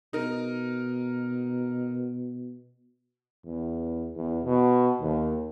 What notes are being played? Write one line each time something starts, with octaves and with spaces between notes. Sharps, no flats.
B2 D#4 A#4
E2
E2
B2
D#2